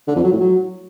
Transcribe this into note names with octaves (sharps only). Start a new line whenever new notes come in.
D3
F2
F#3
A2
F#3